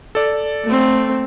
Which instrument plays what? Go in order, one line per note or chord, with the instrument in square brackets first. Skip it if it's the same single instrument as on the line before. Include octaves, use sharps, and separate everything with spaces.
[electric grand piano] A4 D5
[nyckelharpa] A3 C4